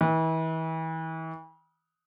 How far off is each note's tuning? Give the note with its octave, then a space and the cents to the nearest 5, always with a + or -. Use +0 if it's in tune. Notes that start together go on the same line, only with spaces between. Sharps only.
E3 -35